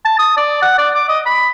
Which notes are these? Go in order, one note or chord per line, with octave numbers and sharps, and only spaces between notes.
A5
D#6
D5
F#5
D5
D6
D#5
B5